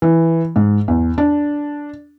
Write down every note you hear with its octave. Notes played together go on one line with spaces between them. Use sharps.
E3
G#2
E2
D4